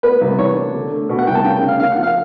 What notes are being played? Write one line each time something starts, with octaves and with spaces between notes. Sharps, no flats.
B3 B4
C2
E3 C#5
D4
D3
A3
B2
F#5
C2 G5
A5
C#3 G5
G5
C#3
F5
C#3 F5
F#5
F3
F5